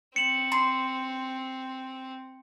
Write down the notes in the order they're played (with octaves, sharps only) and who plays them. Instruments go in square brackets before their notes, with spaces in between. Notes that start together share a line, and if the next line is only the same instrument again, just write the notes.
[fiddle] C4 [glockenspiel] C#7 E7 F#7
[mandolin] C6